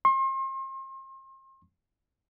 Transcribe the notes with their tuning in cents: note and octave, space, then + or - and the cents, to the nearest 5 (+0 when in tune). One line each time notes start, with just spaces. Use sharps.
C6 +40